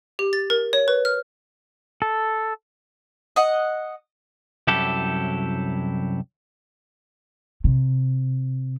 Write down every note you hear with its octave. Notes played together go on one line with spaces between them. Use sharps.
G4
A6
A#4
C#5
B4
F6
A4
D#5 F#5
C2 F#2 F#3 E4 G4 A4
C3